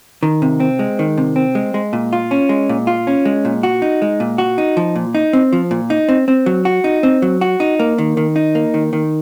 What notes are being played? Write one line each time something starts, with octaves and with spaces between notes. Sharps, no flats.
D#3
C3
C4
G#3
D#3
C3
C4
G#3
G#3
A#2
F4
C#4
G#3
A#2
F4
C#4
G#3
A#2
F#4
D#4
G#3
A#2
F#4
D#4
F3
A#2
D#4
C4
F3
A#2
D#4
C4
C4
F#3
F#4
D#4
C4
F#3
F#4
D#4
A#3
D#3
D#3
D#4
A#3
D#3
D#3